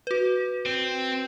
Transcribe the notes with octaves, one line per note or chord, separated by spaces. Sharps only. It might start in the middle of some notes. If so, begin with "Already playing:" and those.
F#4 B4
C4